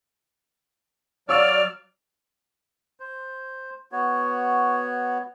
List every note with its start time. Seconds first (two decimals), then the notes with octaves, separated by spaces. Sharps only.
1.29 F#3 C#5 D5 F5 E6 F6
3.00 C5
3.92 B3 F#4 C#5